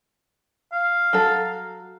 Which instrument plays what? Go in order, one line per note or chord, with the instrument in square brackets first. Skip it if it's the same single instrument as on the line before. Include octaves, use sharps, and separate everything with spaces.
[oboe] F5
[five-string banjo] F#3 A4